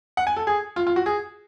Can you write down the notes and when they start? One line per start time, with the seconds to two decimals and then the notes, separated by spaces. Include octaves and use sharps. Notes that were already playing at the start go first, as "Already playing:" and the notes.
0.17 F#5
0.27 G#5
0.37 A4
0.47 G#4
0.76 F4
0.87 F4
0.96 F#4
1.06 G#4